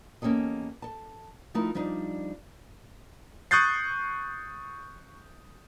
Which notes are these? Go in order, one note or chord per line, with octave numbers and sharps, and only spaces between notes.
E2 A#3 C#4 G4 A4 D#5
A4 A5
F3 A3 D#4 E4 A4 A#4
F3 G3 D4 D#4
C#6 D#6 F#6 G6 A6 C7